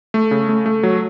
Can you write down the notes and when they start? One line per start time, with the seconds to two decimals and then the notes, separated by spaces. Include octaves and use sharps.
0.14 A3
0.31 C#3
0.49 A3
0.66 A3
0.83 F#3